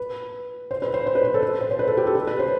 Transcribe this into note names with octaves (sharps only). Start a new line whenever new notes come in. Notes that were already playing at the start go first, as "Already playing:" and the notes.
Already playing: B4
C5
B4
C5
C5
B4
C5
A4
B4
C5
C5
B4
A4
G4
A4
B4
B4
C5